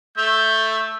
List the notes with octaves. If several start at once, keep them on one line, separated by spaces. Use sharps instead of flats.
A3 E5 G6